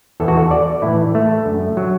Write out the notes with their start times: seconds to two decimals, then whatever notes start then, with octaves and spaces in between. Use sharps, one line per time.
0.20 E2 E3 A4
0.28 F#4
0.37 A4
0.51 D5
0.82 A2 E3 E4
1.15 A3
1.45 F#2 D3
1.77 F#3